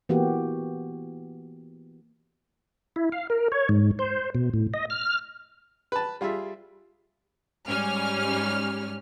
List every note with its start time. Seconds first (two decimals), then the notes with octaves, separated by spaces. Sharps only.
0.09 E3 A#3 B3 F#4 G4
2.96 E4
3.12 F5
3.30 A#4
3.52 C#5
3.69 G#2
3.99 C5
4.35 B2
4.54 A2
4.74 D#5
4.90 F6
5.92 B4 A5
6.21 G3 F4 G#4 E5
7.67 G#2 G3 C#4 F6